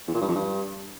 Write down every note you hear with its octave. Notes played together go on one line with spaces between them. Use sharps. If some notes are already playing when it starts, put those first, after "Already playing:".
E2
A#2
G2
F2
G2